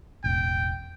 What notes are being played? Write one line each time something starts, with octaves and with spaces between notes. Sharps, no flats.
E1 A1 G5